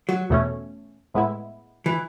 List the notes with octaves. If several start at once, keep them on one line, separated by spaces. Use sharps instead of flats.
F#3
E2 B2 A3 C#4
A2 G#3 B3 E4
E3